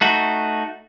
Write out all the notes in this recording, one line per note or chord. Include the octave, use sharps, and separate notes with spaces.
A3 D#4 F#4